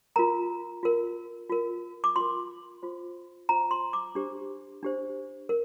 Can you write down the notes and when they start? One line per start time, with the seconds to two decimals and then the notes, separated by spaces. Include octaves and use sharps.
0.16 F4 A#4 A#5
0.83 F4 A#4
1.49 F4 A#4
2.04 D6
2.16 F4 A#4 C6
2.83 F4 C5
3.49 F4 C5 A#5
3.71 C6
3.93 D6
4.15 D4 G4 C5
4.83 D4 G4 C5
5.49 A#4